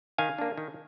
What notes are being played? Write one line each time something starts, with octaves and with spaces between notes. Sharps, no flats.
D#3 F5 G#5
A#3 D4
D#3